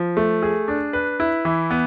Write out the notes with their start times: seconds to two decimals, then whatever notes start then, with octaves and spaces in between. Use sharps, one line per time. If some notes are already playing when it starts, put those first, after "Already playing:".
Already playing: F3
0.17 A3
0.42 G#4
0.68 D4
0.93 B4
1.20 E4
1.45 E3
1.71 B3